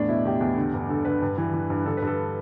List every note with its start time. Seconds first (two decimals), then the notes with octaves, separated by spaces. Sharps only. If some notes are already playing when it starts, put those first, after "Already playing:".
Already playing: E2 A2 D4
0.08 B2 E4
0.25 E2 G4
0.41 E2
0.57 D3
0.74 G2
0.89 D3 A4
1.05 D3 B4
1.22 G2
1.38 E3
1.54 E3
1.70 G2
1.86 D3 A4
1.97 B4
2.02 G2 A4